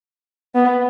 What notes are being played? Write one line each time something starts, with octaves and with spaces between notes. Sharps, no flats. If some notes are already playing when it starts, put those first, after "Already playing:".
B3